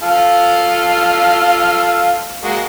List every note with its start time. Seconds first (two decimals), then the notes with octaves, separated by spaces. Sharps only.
0.03 F4 A4 F5
2.43 G#3 A#3 F#4